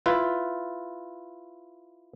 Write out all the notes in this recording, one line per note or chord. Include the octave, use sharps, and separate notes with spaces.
E4 F4 B4